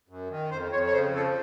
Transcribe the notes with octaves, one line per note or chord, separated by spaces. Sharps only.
F#2
D#3
F2 C5
F2 C#5
C#5
C#3 C5
F3 A4